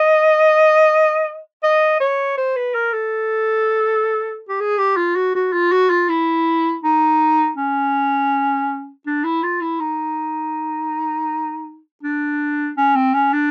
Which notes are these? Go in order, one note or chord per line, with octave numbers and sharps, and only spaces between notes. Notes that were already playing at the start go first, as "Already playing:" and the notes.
Already playing: D#5
D#5
C#5
C5
B4
A#4
A4
G4
G#4
G4
F4
F#4
F#4
F4
F#4
F4
E4
D#4
C#4
D4
E4
F4
E4
D#4
D4
C#4
C4
C#4
D4